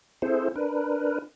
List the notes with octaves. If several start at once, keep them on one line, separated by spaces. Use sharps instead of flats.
C4 E4 G#4 A4 C5
D4 A#4 B4